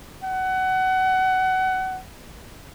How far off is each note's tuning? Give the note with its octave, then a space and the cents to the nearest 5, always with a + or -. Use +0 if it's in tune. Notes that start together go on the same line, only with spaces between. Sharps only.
F#5 +25